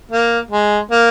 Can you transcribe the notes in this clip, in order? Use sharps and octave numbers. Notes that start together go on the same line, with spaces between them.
A#3
G#3
A#3